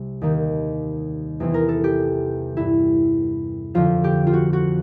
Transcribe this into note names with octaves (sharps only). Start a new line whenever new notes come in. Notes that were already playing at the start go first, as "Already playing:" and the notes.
Already playing: C2 C3
D#2 D#3
E2 C3 E3
A#4
A4
G4
G2 E3 E4
F2 D3 F3 F4
G4
F4
F#4
F#4